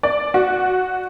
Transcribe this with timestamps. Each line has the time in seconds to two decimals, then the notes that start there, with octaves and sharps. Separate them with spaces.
0.03 D5
0.34 F#4